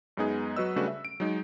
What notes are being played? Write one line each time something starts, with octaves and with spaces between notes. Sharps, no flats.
F#2 G#3 B3 D#4 G#4
F#3 F#4 B4 D#5 E6
C#3 G3 A3 D4 F#4 B4
E5
D7
F#3 G#3 D#4